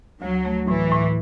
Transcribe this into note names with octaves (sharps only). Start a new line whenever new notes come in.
D2 F#3
A3
A2 E3
A2